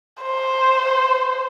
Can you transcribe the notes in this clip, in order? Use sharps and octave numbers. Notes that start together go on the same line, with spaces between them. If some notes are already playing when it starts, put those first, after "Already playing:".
C5